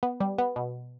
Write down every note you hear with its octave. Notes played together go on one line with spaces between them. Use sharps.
B3
G3
B3
B2